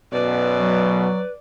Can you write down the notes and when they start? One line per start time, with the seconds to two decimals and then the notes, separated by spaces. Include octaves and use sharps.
0.13 B1 F#2 B2 B4 D5
0.56 F#3